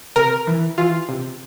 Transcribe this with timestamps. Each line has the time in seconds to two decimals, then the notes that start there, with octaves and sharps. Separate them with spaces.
0.16 C3 A#4
0.47 E3
0.78 E3 F4
1.09 C3